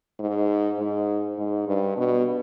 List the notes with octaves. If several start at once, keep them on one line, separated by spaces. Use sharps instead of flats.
G#2
G#2
G#2
G2
B2